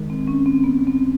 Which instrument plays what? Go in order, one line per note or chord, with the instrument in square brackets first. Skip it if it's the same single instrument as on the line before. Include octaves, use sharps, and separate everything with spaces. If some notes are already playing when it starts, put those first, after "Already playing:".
Already playing: [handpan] D#3 G#3
[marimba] C4
C#4
C4
B3
C4